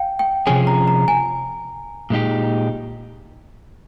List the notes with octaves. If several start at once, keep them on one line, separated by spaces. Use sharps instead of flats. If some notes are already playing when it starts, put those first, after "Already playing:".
Already playing: F5 G5
G5
C3 F3 C#4 G#4 G#5
A#5
A#5
G#5
A#2 G#3 D#4 G4